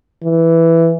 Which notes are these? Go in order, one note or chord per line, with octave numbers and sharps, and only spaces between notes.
E3